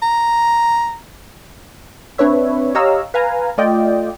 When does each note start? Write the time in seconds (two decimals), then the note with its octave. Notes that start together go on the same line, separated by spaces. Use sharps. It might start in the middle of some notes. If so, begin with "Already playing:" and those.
0.02 A#5
2.18 C4 D4 B4 C#5 E5
2.75 G4 C#5 D#5 F5 A#5 E6
3.14 B4 F5 G#5 A#5
3.58 A3 F4 D5 D#5 G5